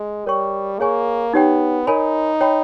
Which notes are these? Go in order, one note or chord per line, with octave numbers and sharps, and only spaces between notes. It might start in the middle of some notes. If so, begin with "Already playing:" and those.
Already playing: G#3
G3 A#4 C#5 G5 C#6
A#3 G#4 C#5 G#5 C#6
B3 D#4 G4 C#5 G5
D#4 A#4 C#5 G#5 B5
C#5 G5 B5